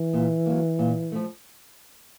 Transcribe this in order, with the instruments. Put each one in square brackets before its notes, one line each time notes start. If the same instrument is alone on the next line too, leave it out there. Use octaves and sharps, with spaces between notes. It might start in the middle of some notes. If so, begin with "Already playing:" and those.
Already playing: [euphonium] E3
[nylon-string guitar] A#2
F#3 A#3
A#2
F3 A3